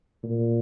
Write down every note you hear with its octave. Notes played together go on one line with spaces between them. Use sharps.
A#2